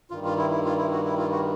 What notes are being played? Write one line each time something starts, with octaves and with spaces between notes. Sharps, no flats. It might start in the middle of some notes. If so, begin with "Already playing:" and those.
G2 D#3 G3 F4
F4
E4
E4
F4
E4
F#4
E4
F4
F#4